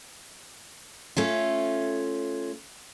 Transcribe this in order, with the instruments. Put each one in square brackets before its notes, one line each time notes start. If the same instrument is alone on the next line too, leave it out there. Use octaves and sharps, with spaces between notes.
[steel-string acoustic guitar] A3 C#4 F4